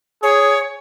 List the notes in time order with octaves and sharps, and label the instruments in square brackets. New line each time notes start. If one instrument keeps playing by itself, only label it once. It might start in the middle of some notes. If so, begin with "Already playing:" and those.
[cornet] G#4 [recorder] C#5